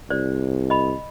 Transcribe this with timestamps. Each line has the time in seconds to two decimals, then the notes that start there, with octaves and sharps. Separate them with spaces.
0.10 C2 C5 D5
0.70 D#5 B5